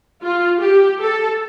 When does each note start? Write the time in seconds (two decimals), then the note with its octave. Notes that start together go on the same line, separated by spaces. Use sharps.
0.22 F4
0.60 G4
0.99 A4